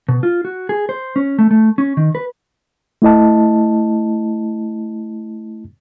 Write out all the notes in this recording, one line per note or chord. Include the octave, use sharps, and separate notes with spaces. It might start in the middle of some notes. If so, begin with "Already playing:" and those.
B2
F4
F#4
G#4
C5
C#4
A3
A3
C#4
D#3
B4
A3 E4 D#5 A5